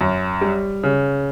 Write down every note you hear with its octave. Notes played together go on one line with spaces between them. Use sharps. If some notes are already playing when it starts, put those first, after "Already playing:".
F#2
G3
C#3